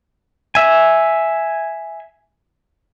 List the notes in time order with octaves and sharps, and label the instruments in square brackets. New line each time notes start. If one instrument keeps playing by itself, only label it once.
[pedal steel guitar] E5 G#5